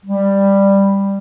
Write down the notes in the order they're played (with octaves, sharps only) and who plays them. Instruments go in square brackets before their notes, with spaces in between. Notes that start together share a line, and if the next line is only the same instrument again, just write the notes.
[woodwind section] G3